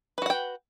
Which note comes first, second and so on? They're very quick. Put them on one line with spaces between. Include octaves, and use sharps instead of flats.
B4 F#4 F#5 G5